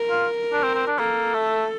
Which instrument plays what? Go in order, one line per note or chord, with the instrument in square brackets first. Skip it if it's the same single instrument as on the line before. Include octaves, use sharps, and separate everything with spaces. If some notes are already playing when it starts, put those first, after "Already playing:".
Already playing: [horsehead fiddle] A#4
[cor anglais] F4
D4
C4
C4
D4
[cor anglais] A#3 [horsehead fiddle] A4
[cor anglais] A3